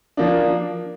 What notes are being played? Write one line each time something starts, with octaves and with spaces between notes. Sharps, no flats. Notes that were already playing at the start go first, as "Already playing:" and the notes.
F3 A#3 D4